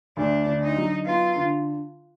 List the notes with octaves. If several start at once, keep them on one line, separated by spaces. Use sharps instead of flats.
D2 D4
D3
D#4
F#3
B3 F4
D3